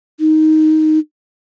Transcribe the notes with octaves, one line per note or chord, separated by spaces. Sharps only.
D#4